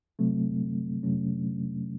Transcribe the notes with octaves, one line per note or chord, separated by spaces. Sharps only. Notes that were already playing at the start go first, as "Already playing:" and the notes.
C3 F#3 A3 C4
F2 C3 F#3 A3 C#4